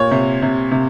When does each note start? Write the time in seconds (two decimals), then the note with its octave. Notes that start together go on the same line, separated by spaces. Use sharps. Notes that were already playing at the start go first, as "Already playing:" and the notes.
Already playing: A#2 C#5
0.11 C3
0.42 C3
0.72 C3